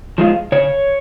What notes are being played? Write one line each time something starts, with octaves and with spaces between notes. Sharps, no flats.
F3 G#3 F4
C#3 C#5